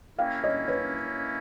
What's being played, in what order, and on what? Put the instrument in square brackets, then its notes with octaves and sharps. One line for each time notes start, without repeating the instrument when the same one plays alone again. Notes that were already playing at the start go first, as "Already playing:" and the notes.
[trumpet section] A#3 C#4 E4 [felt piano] F5 G5
[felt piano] C#5 D#5
B4 C#5